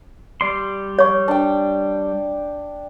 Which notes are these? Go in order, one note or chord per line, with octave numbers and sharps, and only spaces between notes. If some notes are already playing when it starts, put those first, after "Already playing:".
G3 D5 C6
C#5 C#6
D4 G5